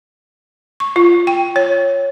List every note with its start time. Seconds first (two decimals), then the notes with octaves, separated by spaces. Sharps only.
0.80 C#6
0.96 F4
1.27 G5
1.56 C#5